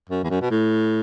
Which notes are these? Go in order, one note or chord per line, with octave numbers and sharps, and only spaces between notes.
F#2
E2
F#2
B2
A2